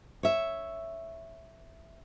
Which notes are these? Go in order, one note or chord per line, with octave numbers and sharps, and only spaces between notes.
C#5 E5